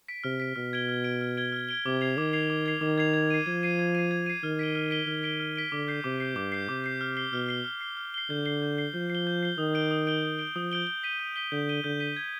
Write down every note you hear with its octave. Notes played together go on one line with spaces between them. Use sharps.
B6 D7
C3 F6
B6 D7
B2 F6
G#6 D7 G7
F6
G#6 D7 G7
F6
G#6 D7 G7
F6
G#6 D7 G7
C3 D6
G#6 C7 F7
D#3 D6
G#6 C7 F7
D6
G#6 C7 F7
D#3 D6
G#6 C7 F7
G#6
C7 D#7
F3 G#6
C7 D#7
G#6
C7 D#7
G#6
C7 D#7
D#3 F6
B6 D7 G7
F6
B6 D7 G7
D#3 F6
B6 D7 G7
F6
B6 D7 G7
D3 D6
G6 C7
C3 D6
G6 C7
G2 D6
G6 C7
C3 D6
G6 C7
F6
C7 G7
B2 F6
C7 G7
F6
C7 G7
F6
C7 G7
D3 G6
C7 G7
G6
C7 G7
F3 G6
C7
G7
G6
C7 G7
D#3 D#6
G6 D7 G7
D#6
G6 D7 G7
D#6
G6 D7 G7
F3 D#6
G6 D7 G7
G6
B6 D#7 G7
G6
B6 D#7 G7
D3 G6
B6 D#7 G7
D3 G6
B6 D#7 G7
G#6